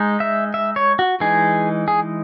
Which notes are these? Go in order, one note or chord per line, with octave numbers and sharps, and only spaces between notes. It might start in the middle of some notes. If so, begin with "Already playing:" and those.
Already playing: G#3 D#4
E5
E5
C#5
F#4
E3 G#3 D#4 G#4
G#4